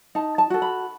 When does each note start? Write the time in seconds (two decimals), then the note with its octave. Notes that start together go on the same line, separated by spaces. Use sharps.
0.15 D#4 A5
0.38 A5
0.50 F#4 A4
0.62 B5